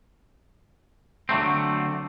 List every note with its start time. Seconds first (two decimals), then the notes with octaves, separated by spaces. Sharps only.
1.29 D3 F#3 A3 C4